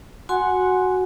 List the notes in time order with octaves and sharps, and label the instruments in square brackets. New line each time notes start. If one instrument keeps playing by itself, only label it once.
[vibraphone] F#4 G#5 C6 [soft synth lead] F#5